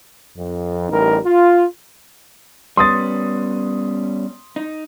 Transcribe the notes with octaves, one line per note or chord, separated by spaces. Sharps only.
F2
A1 G3 D#4 A#4
F4
G3 B3 C#4 C6 D#6 A6
D#4